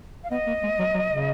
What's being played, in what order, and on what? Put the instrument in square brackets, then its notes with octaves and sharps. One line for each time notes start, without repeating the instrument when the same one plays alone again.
[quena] F5
[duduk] B3 [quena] D#5
[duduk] A#3
G#3
F#3
F#3
C#3